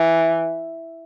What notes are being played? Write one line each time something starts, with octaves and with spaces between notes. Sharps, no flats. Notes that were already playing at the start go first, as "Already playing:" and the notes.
Already playing: E3